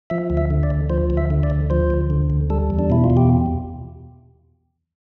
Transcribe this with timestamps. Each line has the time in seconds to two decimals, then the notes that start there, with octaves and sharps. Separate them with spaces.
0.10 F3 E5
0.30 D2
0.37 E5
0.50 D3
0.63 D5
0.70 D2
0.90 F3 C5
1.10 D2
1.17 E5
1.30 D3
1.43 D5
1.50 D2
1.70 F3 C5
1.90 D2
2.10 D3
2.30 D2
2.50 G3 A4
2.70 E2
2.79 D4
2.90 B2 E4
3.04 F4
3.10 E2
3.17 G4